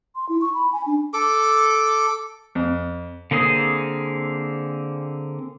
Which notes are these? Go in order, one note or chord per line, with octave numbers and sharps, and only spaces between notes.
C6
E4
C#6
B5
G#5
D4
A4 D6
F2
D3 A#3 C4 G#4 D#6